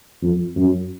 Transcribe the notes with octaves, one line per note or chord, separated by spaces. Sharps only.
F2
F#2